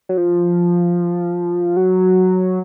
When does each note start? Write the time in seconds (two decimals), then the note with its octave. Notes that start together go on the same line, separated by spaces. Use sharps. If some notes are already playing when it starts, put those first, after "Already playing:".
0.09 F#3
0.17 F3
1.77 F#3